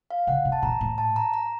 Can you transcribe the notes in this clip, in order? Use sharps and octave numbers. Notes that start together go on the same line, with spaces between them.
F5
C#3 F#5
C3
A5
A#2 A#5
A2
A5
A#5
A#5